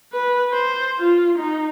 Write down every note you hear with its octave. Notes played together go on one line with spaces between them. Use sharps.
B4
C5
F4
D#4